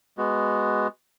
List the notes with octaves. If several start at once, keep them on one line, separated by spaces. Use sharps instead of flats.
G#3 B3 F#4